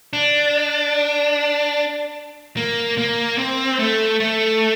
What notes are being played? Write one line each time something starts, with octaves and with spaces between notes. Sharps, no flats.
D4
A#3
A#3
C4
A3
A3